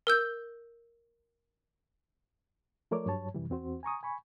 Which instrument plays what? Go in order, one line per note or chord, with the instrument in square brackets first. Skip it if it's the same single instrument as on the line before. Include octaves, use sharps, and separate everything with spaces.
[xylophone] A#4 E6 G6
[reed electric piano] F3 A3 A#4 C#5 D5 D6
G2 F#3 G3 C#5 A5
F#2 C3 E3 G3
E2 C4 F#4 C5
G#5 A#5 C#6 D#6
G#5 B5 C#6